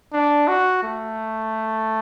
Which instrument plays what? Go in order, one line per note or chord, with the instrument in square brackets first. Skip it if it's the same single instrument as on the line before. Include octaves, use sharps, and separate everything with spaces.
[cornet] D4
F#4
A3